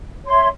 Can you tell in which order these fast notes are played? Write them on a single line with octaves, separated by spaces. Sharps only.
C#5 C6 E5